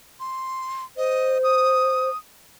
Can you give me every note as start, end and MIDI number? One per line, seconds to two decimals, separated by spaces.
0.20 0.84 84
0.97 2.10 72
0.97 1.38 75
1.43 2.17 87